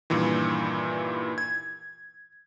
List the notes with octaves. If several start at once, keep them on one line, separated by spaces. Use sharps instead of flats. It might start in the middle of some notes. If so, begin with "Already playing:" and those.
G2 A#2 D#3 E3
G#6